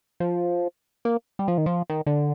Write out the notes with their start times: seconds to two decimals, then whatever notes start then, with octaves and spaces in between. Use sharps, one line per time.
0.20 F3
1.05 A#3
1.39 G3
1.48 F3
1.58 D#3
1.66 F3
1.90 D#3
2.06 D3